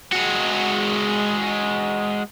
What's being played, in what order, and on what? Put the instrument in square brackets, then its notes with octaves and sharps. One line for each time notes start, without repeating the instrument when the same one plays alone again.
[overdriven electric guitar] G#3 F#4